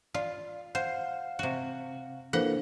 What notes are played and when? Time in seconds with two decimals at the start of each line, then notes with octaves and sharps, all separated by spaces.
0.14 F4 D5
0.75 C5 F5 F#5
1.39 C3 F#4
2.33 E3 F3 A#3 D4 A4 C5 F#5